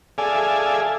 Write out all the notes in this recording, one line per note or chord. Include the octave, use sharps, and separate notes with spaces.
G#4 A4 D5 E5 F5 G#5